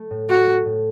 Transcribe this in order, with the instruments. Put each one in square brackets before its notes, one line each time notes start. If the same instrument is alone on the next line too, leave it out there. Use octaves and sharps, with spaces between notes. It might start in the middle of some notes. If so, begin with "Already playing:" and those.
Already playing: [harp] A3
A2
[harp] A3 [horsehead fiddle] F#4
[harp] A3
A2